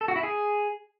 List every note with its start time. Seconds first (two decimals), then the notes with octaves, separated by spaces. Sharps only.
0.01 A4
0.08 F#4
0.16 E4
0.23 G#4